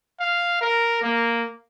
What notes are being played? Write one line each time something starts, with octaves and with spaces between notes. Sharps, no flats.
F5
A#4
A#3